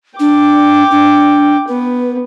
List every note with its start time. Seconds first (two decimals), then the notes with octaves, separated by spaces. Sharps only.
0.20 D4 G5 D6
0.91 D4
1.68 B3 B4